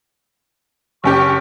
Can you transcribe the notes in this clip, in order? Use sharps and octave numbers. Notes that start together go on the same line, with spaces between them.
F#1 C#4 G4 C#6